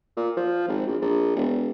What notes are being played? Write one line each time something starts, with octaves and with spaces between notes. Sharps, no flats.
A#2
F3
G#1
A#1
A#1
E1